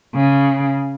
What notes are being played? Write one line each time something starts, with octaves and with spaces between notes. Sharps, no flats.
C#3